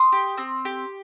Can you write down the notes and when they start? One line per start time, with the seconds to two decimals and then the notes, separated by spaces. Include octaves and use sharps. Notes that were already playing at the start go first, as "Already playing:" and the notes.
Already playing: C6 D#6
0.12 G4
0.38 C4
0.65 G4